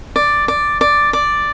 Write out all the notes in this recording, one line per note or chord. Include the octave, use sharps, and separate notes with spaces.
D5
D5
D5
D5